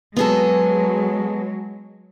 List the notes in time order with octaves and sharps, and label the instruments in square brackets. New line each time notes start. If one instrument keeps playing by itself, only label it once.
[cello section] F#3 G#3 [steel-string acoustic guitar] B3 G#4 A4